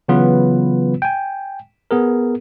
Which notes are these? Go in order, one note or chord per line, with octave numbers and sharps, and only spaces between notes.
C#3 E3 F#3 B3 F4 B4
G5 G#5
B3 G#4 A#4